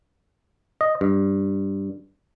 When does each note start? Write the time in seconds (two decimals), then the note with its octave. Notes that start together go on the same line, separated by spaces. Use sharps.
0.81 D#5
1.01 G2